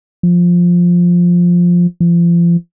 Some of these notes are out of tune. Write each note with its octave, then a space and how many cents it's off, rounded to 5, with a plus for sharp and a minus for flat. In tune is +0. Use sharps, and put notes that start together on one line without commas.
F3 +5
F3 -35